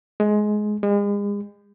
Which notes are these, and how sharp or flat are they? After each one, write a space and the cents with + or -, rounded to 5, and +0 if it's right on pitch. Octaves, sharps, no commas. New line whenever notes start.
G#3 +15
G#3 -40